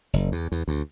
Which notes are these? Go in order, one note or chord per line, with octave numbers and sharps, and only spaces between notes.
F#1
E2
E2
D2